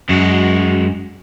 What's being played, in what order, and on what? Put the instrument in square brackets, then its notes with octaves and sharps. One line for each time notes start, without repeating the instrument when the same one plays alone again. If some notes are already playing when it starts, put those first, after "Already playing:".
[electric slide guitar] F#2 [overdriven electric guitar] G#3 F#4